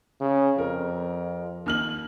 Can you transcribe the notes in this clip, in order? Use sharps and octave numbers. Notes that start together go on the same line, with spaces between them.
C#3
F2 A#4
D#2 F6 F#7